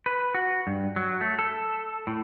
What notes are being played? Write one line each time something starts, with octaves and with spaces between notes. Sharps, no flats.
B4
F#4
G2
F#3
A3
A4
A2